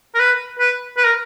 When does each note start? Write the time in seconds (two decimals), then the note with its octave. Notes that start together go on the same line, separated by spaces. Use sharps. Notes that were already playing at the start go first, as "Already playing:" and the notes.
0.14 A#4
0.19 B4
0.59 B4
0.97 B4
1.04 A#4